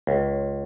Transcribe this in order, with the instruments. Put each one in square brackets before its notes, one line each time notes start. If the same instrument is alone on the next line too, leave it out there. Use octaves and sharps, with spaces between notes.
[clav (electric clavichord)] C#2